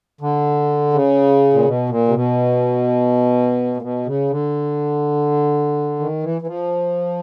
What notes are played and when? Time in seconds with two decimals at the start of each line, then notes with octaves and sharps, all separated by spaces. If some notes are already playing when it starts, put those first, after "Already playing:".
0.21 D3
0.93 C#3
1.53 A#2
1.65 B2
1.89 A#2
2.08 C3
2.14 B2
3.77 A#2
3.82 B2
4.06 C#3
4.30 D3
5.99 D#3
6.23 E3
6.42 E3
6.47 F3